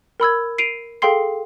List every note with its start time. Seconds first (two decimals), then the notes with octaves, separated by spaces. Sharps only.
0.20 A#4 B5 E6 G#6
0.58 C7 D7 D#7 F7
1.02 G#4 A4 F5 G5 C6 C7